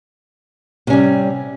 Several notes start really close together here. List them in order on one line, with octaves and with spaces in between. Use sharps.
C3 C#4 G3